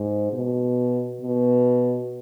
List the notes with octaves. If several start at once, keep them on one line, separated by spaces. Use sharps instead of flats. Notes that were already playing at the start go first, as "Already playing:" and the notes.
Already playing: G#2
B2
B2